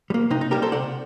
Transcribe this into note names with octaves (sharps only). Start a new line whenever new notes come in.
G3
A#3
C3 D#4
D#4
G3 A#3 G4 A#4
A4 C5
C3 D5 F#5